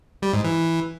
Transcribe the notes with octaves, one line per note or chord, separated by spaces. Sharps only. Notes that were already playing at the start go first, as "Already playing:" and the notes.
G3
G#2
E3